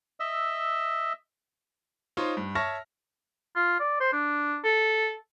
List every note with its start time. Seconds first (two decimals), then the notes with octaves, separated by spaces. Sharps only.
0.20 D#5 E5 E6
2.17 D#4 F4 C5 C#5
2.37 G2
2.55 C#5 E5 A5 C#6 F6 A#6
3.56 F4
3.80 D5
4.01 C5
4.13 D4
4.64 A4